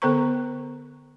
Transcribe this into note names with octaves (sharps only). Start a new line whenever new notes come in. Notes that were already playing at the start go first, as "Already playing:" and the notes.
D3 B3 A4 C5 A#5 C#6